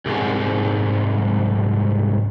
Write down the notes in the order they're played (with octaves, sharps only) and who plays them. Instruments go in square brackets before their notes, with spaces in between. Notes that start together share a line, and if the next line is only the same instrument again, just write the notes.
[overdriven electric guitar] C2 G#2